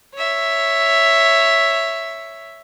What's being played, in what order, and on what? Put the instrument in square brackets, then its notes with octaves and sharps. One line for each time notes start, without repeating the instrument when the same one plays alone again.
[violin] C#5 E5